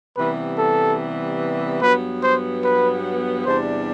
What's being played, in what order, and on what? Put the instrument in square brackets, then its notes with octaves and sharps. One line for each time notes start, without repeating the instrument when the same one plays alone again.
[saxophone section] C3 E3 G3 B3 [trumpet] B4
[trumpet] A4
[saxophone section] G2 F#3 B3 [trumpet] B4
[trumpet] C5
B4
[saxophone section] E2 C3 G3 D4 [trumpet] C5